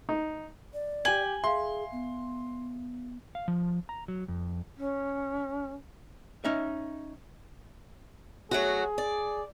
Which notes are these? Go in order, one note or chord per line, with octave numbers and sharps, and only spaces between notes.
D#4
D5
G4 G#5 F#7
G#4 E5 F5 C6
B3
F5
F3
A#5
F#3
F2
C#4
C#4 D#4 E5
F#3 A3 F#4 G#4
D5